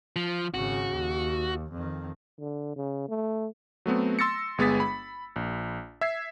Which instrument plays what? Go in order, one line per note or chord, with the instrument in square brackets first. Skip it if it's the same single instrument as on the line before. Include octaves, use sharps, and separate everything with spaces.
[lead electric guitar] F3
[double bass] G#1 C#3 [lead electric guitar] F#4
[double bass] D#2
F2 D#3
[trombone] D3
C#3
A3
[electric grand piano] F#3 A3 B3 C4
C6 E6 A6 A#6 C#7
G1 G#3 B3 G#4 A6 B6
B5
A#1
E5 G#6 C7